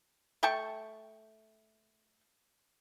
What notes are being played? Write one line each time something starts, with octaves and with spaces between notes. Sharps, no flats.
A3 G5 A5 C#6